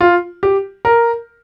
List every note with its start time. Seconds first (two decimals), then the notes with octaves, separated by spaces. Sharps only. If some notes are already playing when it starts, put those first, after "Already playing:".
0.01 F4
0.43 G4
0.85 A#4